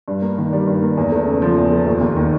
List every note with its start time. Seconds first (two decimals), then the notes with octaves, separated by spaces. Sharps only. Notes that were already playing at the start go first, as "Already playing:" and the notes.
0.08 G2
0.22 A#3
0.38 D#3
0.53 G3
0.67 G2
0.82 A#3
0.97 E2
1.12 A3
1.26 C#3
1.42 F3
1.57 E2
1.72 A3
1.87 D#2
2.01 D#2
2.16 D#3